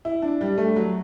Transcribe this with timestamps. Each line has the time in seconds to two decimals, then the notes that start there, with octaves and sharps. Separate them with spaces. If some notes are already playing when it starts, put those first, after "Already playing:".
0.05 E4
0.22 D4
0.41 G3
0.58 A3
0.76 F#3